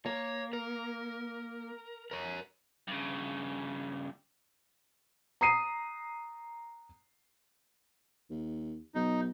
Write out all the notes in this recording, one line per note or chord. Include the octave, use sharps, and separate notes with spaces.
A#3 C#5
A#4
A#4 C#5
G2 C#3
A#5 D#6 C7 D#7
D#2
B1 D#4